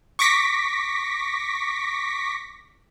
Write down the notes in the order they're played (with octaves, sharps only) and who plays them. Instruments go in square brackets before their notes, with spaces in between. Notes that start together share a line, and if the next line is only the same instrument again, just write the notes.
[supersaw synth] C#6 D6 A#6 B6